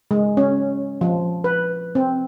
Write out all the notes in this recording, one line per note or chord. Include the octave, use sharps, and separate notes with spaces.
G#3
C#4
F3
B4
C4